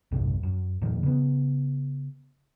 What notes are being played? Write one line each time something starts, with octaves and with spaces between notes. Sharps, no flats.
B1 E2 G2 C3
F#2
E2 A#2 D#3 F3
C#3 B3